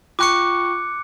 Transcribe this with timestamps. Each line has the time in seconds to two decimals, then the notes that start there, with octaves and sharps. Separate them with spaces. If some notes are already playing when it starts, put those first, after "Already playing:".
0.19 F4 G5 C#6 D6 F#6 C#7